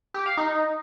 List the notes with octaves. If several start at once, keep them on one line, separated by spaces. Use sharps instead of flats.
G4
F5
D#4